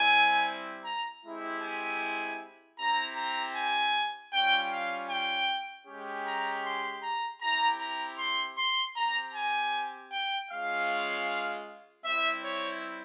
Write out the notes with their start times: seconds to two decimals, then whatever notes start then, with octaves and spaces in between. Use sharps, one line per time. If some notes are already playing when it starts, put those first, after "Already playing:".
Already playing: G3 C4 E4 G#5
0.85 A#5
1.24 G#3 C4 E4 G4
1.63 G#5
2.78 C4 E4 G4 A#5
3.17 A#5
3.55 G#5
4.33 G3 C#4 F4 G5
4.72 F5
5.10 G5
5.87 G#3 C#4 G4
6.26 A#5
6.64 C6
7.03 A#5
7.42 C4 E4 G4 A#5
7.81 A#5
8.19 C6
8.58 C6
8.96 C4 G4 A#5
9.35 G#5
10.12 G5
10.51 G#3 C#4 F4 F5
12.05 G3 C4 E4 E5
12.44 C#5